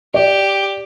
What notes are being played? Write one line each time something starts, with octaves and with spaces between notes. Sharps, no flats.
G4 D5